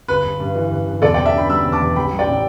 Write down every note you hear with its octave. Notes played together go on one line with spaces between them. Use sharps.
G1 B4
G1
G2
E3
G1
G1
E2 A4 D5
D5 G5
E2
E5 A5
D3 G5 B5
G3 B5 E6
E2
A5 D6
E2
A1 G5 B5
G3
D5 G5
A2
G5